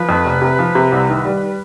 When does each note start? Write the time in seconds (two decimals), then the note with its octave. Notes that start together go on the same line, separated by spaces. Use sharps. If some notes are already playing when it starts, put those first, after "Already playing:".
Already playing: F3 B4
0.09 F2
0.26 F1
0.42 C3
0.59 F3
0.75 C3
0.92 C2
1.09 D#3
1.25 G3